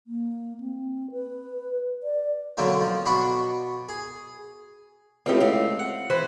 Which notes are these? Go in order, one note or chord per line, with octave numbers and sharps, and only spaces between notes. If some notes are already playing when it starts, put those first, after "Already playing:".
A#3
C4
B4
D5
B2 D3 F#3 A#3 C4
F3
B2 D4 F#4 B5 C#6
G#4
C#2 A2 C4 D#4 G4
C4 F5
F#5
E3 B4 C5